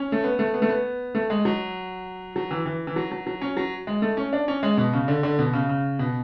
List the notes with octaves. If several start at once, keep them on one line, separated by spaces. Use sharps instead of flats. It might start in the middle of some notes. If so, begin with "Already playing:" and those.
Already playing: C#4
A3
B3
A3
B3
A3
B3
A3
G#3
F#3
F#3
E3
E3
E3
F#3
F#3
F#3
C#4
F#3
G#3
A3
C#4
D4
C#4
G#3
B2
C#3
D3
D3
B2
C#3
C#3
B2